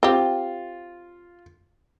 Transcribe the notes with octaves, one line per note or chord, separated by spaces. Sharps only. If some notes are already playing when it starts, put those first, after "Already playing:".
C4 F4 G4